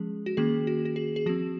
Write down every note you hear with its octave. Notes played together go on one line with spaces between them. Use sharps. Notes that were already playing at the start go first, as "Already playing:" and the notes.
Already playing: F3 G#3 C#4 G#4
F#4
D#3 A#3 C#4 G#4
F#4
F#4
G#4
G#4
F3 C4 F#4